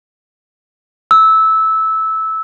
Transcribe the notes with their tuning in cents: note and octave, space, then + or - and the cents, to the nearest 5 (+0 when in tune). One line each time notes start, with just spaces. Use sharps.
E6 -15